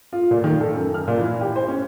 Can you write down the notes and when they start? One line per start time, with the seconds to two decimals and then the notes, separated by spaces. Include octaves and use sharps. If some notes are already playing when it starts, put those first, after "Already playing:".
0.13 F4
0.31 A#2
0.44 D#3
0.60 A4
0.74 F#2
0.94 F6
1.08 A#2
1.21 E3
1.41 G4
1.56 C5
1.68 C#4